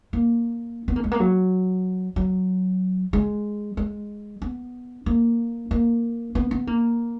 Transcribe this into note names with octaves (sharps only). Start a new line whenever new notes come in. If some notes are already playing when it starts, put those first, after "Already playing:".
A#3
B3
A#3
G#3
A#3
F#3
F#3
G#3
G#3
B3
A#3
A#3
B3
B3
A#3